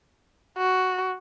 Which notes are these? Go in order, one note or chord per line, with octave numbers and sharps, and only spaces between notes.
F#4